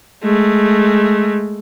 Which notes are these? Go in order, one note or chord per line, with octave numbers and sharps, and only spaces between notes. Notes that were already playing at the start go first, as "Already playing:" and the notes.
G#3 A3